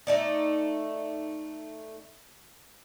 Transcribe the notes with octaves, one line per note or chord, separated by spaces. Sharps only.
A3 D#4 D5